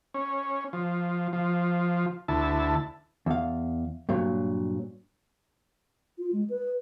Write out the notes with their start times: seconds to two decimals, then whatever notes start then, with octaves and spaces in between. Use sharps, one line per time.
0.14 C#4
0.73 F3
1.33 F3
2.28 D2 E4 A5
3.26 E2 F5
4.09 G2 A#2 F#3
6.18 F4
6.33 G#3
6.50 B4